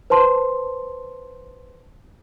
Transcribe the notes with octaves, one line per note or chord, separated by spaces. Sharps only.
B4 C5 A5 C6